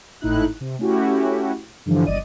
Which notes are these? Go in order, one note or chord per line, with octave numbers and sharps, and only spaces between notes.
G#1 A2 D#4 E4 F#6
C3
A3 C#4 E4 F#4 G4
G2 D3 E3 F3
G1 C2 D5 D#5 D#7